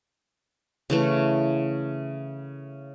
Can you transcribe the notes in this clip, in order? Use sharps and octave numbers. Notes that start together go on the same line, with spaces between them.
C#3 E3 A3